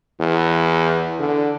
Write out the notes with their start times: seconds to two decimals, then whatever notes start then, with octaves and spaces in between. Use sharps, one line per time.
0.20 E2
1.19 D3